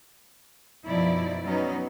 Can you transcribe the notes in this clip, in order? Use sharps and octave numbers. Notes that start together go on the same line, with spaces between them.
F#2 B2 F3 D#4 E4 D5
F#3 B3 C#4 D#4